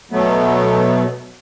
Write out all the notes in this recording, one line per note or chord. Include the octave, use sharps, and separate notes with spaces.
B2 F#3 A3 B3